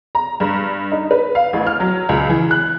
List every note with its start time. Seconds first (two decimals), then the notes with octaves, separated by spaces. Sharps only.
0.15 A#5
0.40 G2
0.92 D#4
1.11 B4
1.35 F5
1.53 A1
1.67 F6
1.80 F#3
2.09 C#2
2.29 E3
2.51 F#6